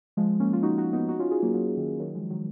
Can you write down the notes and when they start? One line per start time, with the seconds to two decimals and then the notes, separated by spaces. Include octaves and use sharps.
0.17 F3 G#3
0.40 A#3 C#4
0.53 F4
0.63 D#4 F#4
0.78 D#4 F#4
0.93 B3 D#4
1.08 D#4 F#4
1.20 C#4 F4
1.31 F4 G#4
1.42 F#3 A#3
1.54 F#3 A#3
1.77 D#3
2.00 D#3 F#3
2.15 F3 G#3
2.30 D#3 F#3